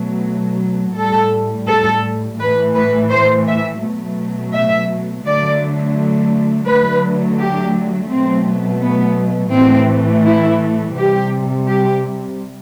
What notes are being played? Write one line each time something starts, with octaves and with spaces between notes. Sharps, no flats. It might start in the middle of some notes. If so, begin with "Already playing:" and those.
Already playing: B2 F#3 A3
A2 G3 A4
A4
A2 E3 A3 B4
B4
C5
E5
B2 F#3 A3
E5
D3 F#3 A3 D5
D3 F#3 A3 B4
G4
B2 F#3 A3 C4
B3
A2 E3 A3 C4
E4
C3 G3 G4
G4